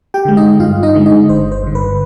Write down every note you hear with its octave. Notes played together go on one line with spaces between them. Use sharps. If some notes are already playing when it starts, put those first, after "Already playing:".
G4 G5
D3 G#3
D#4 D#5
G2 F4 F5
D#4 D#5
D3 G#3
D#4 D#5
G1 C5
C5
G2 D3
B4